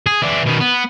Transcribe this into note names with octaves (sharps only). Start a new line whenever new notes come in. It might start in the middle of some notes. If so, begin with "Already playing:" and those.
G#4
E3 D4
B2 D#3
B3